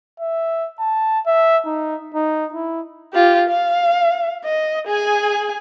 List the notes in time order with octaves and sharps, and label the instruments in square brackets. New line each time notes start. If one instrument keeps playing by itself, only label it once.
[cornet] E5
A5
E5
D#4
D#4
E4
[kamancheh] F4 G4
F5
D#5
G#4 G#5